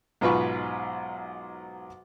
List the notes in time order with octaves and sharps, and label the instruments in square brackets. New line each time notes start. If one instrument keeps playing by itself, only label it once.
[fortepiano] B1 G#2 F4 B4 B5 C#6